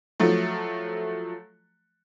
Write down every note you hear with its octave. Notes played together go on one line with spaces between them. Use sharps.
F3 F#3 A3